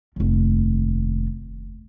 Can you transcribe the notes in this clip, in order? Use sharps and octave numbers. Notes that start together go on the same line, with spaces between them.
F1 D#2